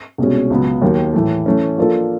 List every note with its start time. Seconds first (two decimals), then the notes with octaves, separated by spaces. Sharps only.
0.18 C2 B2 G#3 C#4
0.50 C#2 C#3 F#3 B3
0.82 D#2 D#3 F#3
1.14 A2 E3 A3
1.46 E3 A3 C#4
1.78 F3 A#3 D4 F4 A4